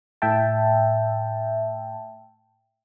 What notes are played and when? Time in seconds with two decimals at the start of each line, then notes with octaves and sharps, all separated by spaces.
0.22 A2 E5 G5 A5